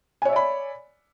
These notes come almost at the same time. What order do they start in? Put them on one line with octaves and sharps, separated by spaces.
G#5 C#5 E5 D5 B5